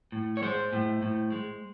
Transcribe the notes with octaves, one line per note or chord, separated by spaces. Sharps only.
A2
C#5
G#3 C5
A2
A2
G#3